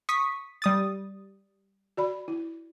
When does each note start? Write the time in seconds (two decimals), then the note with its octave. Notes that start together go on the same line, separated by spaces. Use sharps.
0.09 C#6 D#6 B6
0.62 G3 D#6 A6
1.97 F#4 D5 B5
2.28 E4